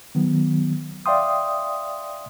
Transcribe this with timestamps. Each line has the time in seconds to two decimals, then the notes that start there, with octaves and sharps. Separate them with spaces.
0.15 D#3 F#3 B3
1.06 D5 E5 F5 G5 C6 D#6